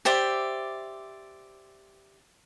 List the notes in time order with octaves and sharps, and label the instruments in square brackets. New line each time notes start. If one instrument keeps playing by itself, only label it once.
[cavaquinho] G4 C5 D5 E5